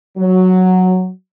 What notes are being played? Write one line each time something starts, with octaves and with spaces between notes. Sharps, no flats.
F#3